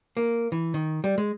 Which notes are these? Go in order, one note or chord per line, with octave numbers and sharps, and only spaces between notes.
A#3
E3
D#3
G3
G#3